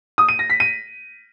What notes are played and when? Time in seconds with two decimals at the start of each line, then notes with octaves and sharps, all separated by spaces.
0.18 D#6
0.29 D#7
0.39 A#6
0.50 B6
0.60 D#7